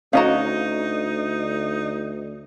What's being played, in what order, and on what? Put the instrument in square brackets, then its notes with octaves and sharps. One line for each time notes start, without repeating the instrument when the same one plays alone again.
[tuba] D2 [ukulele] C#4 A#5 [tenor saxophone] D#4 [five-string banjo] F#4 D#5 F5